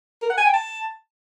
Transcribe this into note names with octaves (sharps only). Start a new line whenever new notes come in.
A#4
F#5
G#5
G5
A5